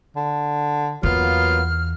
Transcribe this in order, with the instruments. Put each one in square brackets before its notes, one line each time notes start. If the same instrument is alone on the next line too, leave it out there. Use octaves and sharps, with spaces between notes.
[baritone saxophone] D3
[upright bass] E2 [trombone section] F#3 A#3 B3 [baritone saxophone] F4 [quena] F6